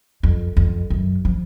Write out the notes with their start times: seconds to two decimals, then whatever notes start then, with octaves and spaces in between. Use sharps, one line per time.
0.23 F2
0.57 F2
0.90 F#2
1.25 F3